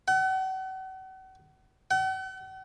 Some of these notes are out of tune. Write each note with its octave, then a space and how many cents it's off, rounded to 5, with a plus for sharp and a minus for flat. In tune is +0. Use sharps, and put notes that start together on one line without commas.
F#5 +40
F#5 +45